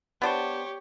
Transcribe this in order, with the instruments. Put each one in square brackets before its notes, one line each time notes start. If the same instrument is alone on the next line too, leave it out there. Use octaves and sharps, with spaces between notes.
[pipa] B3 D4 C5 [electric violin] G4 C#5